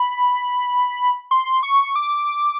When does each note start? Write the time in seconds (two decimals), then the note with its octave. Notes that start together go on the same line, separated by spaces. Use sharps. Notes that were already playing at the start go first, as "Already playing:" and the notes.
Already playing: B5
1.31 C6
1.63 C#6
1.96 D6